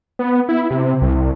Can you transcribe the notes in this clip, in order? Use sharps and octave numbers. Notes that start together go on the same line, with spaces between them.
B3
E4
C3
C2